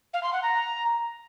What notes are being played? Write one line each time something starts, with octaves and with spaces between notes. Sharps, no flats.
F5
C6
F#5
A#5